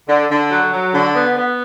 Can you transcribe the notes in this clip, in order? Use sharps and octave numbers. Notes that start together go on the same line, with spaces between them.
D3
D3
F#3
F#3
D3
B3
B3